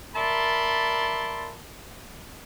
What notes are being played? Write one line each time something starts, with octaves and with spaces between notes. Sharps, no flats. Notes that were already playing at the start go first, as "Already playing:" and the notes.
A#4 D5 E5 A5 B5 C6